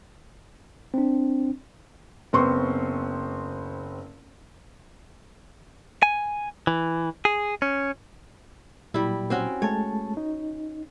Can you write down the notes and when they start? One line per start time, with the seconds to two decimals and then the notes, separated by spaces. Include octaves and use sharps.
0.94 C4 D4
2.33 F#1 B3 C4 C6 C#6
6.03 G#5
6.67 E3
7.25 G#4
7.62 C#4
8.94 A#2 F#3 G3 E4
9.30 C4 C#4 F#4
9.62 G#3 A3 C#5 A5
10.17 D#4